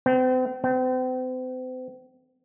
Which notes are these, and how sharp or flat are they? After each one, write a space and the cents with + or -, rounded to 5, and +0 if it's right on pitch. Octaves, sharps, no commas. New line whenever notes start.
C4 -40
C4 -40